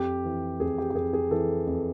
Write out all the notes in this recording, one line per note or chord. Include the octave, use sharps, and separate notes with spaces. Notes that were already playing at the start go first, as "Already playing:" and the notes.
Already playing: F2 G4
E3
F2 G#4
G4
G4
F2 G#4
G#4
E3 A4
F2